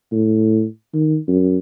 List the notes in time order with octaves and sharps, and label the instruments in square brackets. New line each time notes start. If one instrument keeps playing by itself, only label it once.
[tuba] A2
D#3
F#2